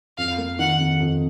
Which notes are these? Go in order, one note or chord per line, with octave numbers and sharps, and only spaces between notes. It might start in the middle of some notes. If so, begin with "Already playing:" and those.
F2 F5
A#3
D#3 F#5
F2
F2